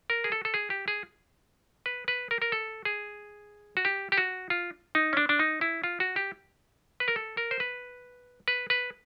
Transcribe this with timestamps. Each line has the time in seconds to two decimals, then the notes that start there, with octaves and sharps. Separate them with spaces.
0.10 A#4
0.24 G#4
0.32 A4
0.45 A4
0.54 G#4
0.70 G4
0.88 G#4
1.86 B4
2.08 B4
2.31 A#4
2.42 A#4
2.52 A4
2.85 G#4
3.77 F#4
3.85 G4
4.12 G4
4.18 F#4
4.50 F4
4.95 D#4
5.13 C#4
5.17 D4
5.29 D4
5.39 D#4
5.61 E4
5.84 F4
6.00 F#4
6.16 G4
7.00 B4
7.08 A#4
7.16 A4
7.37 A#4
7.51 C5
7.60 B4
8.48 B4
8.70 B4